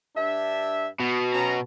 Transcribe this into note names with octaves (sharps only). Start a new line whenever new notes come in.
G2 D4 E5
B2
F#3 C#4 A#5